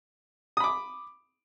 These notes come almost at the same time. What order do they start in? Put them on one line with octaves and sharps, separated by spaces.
D#6 B5 D6